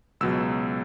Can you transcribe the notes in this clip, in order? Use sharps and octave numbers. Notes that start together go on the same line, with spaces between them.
C#2 B2 F#3 E6